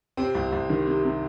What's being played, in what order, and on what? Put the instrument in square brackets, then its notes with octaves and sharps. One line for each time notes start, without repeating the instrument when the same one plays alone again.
[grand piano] C3 C4
C2
C2
D#3
C3
C3